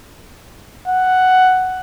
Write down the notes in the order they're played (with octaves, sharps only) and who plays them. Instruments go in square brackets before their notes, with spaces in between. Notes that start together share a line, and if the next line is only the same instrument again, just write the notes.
[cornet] F#5